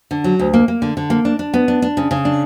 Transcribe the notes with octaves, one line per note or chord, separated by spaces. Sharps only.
D3
F#3
D2
A#3
A#3
D3
D3
A#3
D4
D4
B3
D4
D4
C#3
C#3
D4